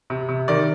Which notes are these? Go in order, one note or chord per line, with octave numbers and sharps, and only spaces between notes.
C3
C3
D#3 D5